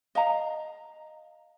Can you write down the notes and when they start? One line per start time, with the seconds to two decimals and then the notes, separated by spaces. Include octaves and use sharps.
0.15 D#5 F5 A#5